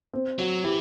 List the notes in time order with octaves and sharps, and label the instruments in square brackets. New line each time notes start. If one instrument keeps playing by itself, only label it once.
[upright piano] C4
[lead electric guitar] F#3 [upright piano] F#4
[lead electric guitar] E3 [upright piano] G4